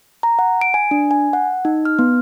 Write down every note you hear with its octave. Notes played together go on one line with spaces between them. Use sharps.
A#5
F#5
D7
G#5
D4
G#5
F#5
D#4
F6
B3